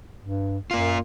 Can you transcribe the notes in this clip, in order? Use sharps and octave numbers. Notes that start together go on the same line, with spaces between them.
G2
F#2 A#3 F4